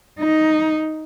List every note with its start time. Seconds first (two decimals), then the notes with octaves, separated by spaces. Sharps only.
0.19 D#4